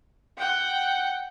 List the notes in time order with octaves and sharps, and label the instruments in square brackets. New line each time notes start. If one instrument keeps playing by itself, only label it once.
[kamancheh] F#5 G5